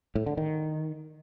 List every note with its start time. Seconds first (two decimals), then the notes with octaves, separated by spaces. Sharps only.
0.15 A2
0.26 D3
0.37 D#3